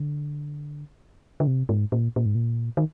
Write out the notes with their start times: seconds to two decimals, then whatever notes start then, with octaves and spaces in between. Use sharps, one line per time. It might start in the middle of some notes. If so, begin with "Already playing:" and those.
Already playing: D3
1.40 D3
1.47 C3
1.69 G#2
1.92 A#2
2.16 A#2
2.26 G#2
2.35 A#2
2.77 D#3